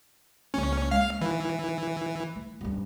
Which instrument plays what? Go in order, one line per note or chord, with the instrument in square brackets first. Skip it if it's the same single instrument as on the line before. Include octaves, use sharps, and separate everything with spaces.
[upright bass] C#2 A#3 [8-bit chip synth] C#4
[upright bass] G#3 A#3 [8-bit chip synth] F5
[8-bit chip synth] E3 [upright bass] D#4
[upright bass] A3
D#1 G2